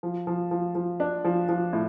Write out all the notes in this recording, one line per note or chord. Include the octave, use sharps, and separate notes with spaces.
F3
F3
F3
F3
D4
F3
F3
A2